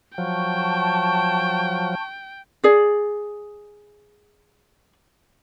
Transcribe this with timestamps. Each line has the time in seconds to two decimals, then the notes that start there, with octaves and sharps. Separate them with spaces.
0.18 F3 F#3 G5 A5 C#6
2.64 G#4 D5